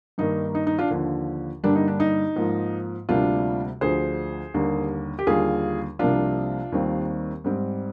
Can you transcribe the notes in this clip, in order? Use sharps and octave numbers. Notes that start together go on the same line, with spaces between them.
G2 D#3 A#3 D#4
D#4
D#4
D4 F4
D#2 D3 F3
G2 D3 G3 A#3 D4
D#4
D4
D#4
G#2 F3 A#3
D2 C3 G3 A#3 D4 F4
D2 D3 F3 G#4 C5
D#2 D3 G3 A#3
G4
D#2 D3 G3 F4 G#4
C2 C3 F3 A#3 D4 F4
D#2 D#3 G3 C4
G#2 G3 C4